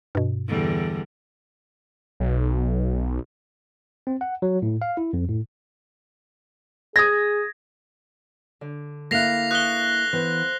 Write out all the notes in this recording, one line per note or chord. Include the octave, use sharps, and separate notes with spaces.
G2 B2
E2 D3 G3
B1
C4
F#5
F#3
A2
F5
E4
F2
A2
G#4 D#6 G#6 A#6
D3
A#3 E4 A4 F5 F#6 A#6 C7 F7
B4 C#6 D#6 F#6 G7
E3 B3 C5